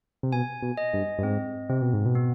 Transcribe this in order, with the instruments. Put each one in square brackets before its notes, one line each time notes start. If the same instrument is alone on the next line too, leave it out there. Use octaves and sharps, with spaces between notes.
[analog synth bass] C3
[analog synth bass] B2 [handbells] G#5
[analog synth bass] B2
[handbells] D#5
[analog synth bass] G2
G2
[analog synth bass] G#2 [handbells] C4
[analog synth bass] C3 [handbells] C4
[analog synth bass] B2
G#2
B2
[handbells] B3